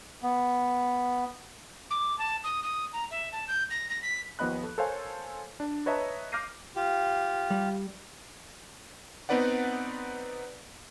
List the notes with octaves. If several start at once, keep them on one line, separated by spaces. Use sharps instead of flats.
B3
D6
A5
D#6
D#6
A#5
E5
A5
G6
A#6
A#6
B6
D#2 F3 B3 D#5 B5 F#6
A4
A4 A#4 C5 C#5 F5 G#5
D4
B4 C#5 D#5 E5 A5 A#5
D6 F6 G6 A#6 C7 D#7
F4 G4
G3
B3 C4 D#4 B4 D5 F#5